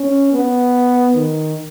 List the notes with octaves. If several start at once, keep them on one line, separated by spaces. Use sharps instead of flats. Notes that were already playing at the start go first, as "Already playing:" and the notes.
Already playing: C#4
B3
D#3